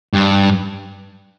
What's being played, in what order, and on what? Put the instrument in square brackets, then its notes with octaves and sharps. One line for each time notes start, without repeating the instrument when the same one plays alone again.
[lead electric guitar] G2